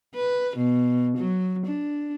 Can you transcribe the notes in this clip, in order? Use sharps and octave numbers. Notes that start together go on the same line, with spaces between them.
B4
B2
F#3
D4